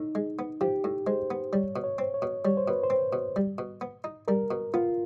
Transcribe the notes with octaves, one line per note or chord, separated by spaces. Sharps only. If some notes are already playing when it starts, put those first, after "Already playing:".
Already playing: A2 D#4
G#3
B3
F3 G4
A2
G#3 C5
B3
G3 C#5
B2
C#5
C4
C#5
B2
G3 C#5
C5
B2 B4
C5
C4
B2
G3
B2
B3
D#4
G3 A#4
B2
B3 F4